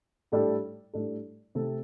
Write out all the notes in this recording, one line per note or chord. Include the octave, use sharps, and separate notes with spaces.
A2 G3 D4 A4
A2 G3 D4 A4
C3 A3 C4 A4